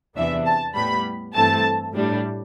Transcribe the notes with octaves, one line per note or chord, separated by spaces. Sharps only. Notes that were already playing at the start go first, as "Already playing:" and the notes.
E2 C3 E3 B3 D4 E5
A5
A2 G3 B3 B5
G2 E3 A3 C4 A5
A2 G3 D4